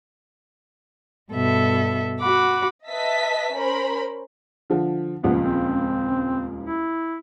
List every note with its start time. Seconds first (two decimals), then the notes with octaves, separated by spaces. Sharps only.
1.32 G2 B2 A4 E5
2.21 F#4 F#5 B5 D6
2.88 B4 D#5 E5 A5 B6
3.54 C#4 A#4 C5 B5
4.70 D3 F3
5.24 D#1 C#2 F3 B3
5.38 C4
6.63 E4